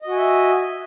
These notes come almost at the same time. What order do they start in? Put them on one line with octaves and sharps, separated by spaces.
D#5 F#4 G#5 E5